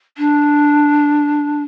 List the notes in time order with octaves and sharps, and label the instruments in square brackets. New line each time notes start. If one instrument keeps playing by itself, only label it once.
[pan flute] D4